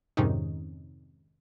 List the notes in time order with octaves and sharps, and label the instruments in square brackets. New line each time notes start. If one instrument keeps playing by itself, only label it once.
[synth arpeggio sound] F2 G#2 C3 D#3 C#4 D#4